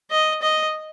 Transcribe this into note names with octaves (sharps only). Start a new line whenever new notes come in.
D#5
D#5